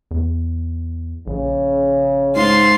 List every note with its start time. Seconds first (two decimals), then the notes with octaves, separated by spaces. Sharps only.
0.11 E2
1.27 A#1 C#3
2.36 G#2 F4 C6